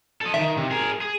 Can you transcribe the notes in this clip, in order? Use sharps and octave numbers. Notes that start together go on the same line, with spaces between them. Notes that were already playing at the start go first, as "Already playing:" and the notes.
A4 D#5
D#3 E5
C3
G#4 A#4
G#4